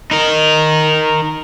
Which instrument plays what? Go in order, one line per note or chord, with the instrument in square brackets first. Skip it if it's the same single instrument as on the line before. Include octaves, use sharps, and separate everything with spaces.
[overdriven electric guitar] D#4 A#4